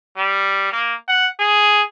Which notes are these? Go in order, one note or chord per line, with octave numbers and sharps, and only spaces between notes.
G3
A#3
F#5
G#4